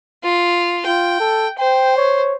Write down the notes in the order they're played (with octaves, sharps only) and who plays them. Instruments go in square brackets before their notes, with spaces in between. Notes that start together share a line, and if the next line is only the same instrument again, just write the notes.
[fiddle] F4
[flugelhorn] F4 [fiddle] G5
[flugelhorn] A4
[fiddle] C5 [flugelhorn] G5
[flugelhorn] C#5